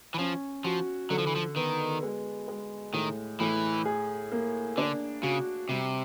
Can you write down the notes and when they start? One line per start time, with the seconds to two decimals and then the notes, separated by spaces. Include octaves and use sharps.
0.14 E3
0.18 F3 C#4
0.64 F3 F#4
1.10 D3 F#3
1.18 F3
1.27 E3
1.36 F3
1.56 D#3 B3
2.03 G#3
2.48 G#3
2.93 A2 D#3
3.40 A2 E3
3.85 G#4
4.32 A#3
4.77 D3 D4
5.23 C#3 F#4
5.69 C3 G3